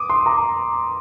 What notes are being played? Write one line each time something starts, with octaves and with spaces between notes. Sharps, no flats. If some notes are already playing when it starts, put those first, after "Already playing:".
Already playing: D6 D#6
C6
A#5